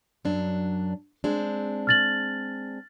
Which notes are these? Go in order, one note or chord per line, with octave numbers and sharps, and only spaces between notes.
F#2 F#3 D4
G#3 C4 D4
F6 A6 F#7